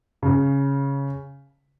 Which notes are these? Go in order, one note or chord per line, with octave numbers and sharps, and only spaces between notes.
C#3